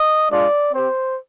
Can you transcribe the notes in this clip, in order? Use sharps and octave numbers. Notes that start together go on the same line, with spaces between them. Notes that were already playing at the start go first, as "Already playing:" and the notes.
Already playing: D#5
G#3 D4 F4 D5
C4 G4 C5